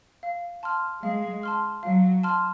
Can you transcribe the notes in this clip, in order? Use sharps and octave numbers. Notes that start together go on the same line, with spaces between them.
F5
A5 C6 F6
G#3 F5
A5 C6 F6
F#3 F5
A5 C6 F6